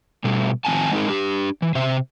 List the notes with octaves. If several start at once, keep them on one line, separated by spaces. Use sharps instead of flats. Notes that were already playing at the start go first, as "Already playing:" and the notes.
B2 G3 A3
D#3 F3 C4 G#5 A5
G#3 C4 D#4 E4 G#4 A#4
D4 G4
E3
C3 C5 E5